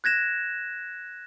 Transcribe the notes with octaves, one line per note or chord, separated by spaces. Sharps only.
F#6 G#6 A#6 E7